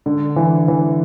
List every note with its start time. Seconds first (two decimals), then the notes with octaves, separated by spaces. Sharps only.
0.06 D3
0.36 E3
0.68 E3